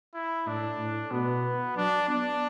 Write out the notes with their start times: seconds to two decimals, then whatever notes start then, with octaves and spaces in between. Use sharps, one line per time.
0.14 E4
0.46 A2 D4
0.78 A2
1.11 B2 B3
1.76 F#3 D4
2.08 B3 D4